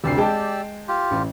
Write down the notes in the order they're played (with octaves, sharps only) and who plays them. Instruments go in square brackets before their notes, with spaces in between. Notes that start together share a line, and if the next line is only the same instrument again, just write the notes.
[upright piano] F1 D2 C7 [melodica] G4 D5 E6
[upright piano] G#3 G5 A5
[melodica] F4 G4
[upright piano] A1